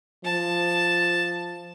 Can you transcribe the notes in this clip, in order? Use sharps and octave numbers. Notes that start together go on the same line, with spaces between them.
F3 A5